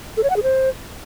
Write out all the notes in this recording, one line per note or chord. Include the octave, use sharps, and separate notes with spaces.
A4
C#5
F#5
G#4
C5